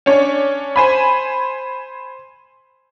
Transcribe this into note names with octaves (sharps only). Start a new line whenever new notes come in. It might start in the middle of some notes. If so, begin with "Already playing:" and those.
C#4 D4 C#5
C5 G#5 B5